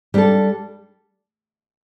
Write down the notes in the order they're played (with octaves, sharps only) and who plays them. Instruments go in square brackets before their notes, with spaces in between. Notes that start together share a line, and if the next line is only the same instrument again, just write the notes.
[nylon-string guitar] G3 D4 A4